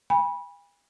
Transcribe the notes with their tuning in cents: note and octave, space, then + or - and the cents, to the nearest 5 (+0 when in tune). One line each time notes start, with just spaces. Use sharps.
G#5 -45 B5 -20